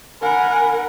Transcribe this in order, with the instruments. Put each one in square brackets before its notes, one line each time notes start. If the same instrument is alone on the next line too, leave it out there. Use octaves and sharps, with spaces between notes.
[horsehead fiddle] A#4 F#5 [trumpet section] G#5 B5